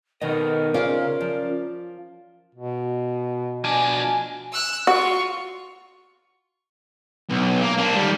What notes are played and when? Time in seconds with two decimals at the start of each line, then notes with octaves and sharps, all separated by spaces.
0.21 B2 D#3 D#4 A4 A#4 D#5
0.74 C#3 C#4 F4 C5 D5
1.21 F3
2.55 B2
3.64 B2 F3 D4 G#5
4.52 E6 F#6
4.87 F4 F#4 C#6
7.30 B1
7.61 A#3
7.78 A#3 D4
7.95 D#3 G3